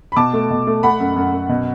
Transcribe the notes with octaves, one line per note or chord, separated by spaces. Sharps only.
B5
B2 A5 D6
A3
B2
A3
A3 F#5 B5
F#2
F#2
F#2
B2